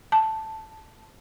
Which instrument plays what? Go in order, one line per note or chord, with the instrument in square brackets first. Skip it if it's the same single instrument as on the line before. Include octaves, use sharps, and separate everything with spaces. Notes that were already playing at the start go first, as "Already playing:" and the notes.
[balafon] A5